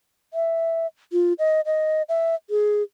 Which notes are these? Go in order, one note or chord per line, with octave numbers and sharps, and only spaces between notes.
E5
F4
D#5
D#5
E5
G#4